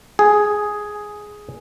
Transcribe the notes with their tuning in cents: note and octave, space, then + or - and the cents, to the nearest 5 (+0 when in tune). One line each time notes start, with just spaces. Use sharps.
G#4 +5